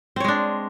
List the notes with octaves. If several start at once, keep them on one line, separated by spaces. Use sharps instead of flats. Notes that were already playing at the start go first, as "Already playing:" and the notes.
G#3 C4 D4 C#5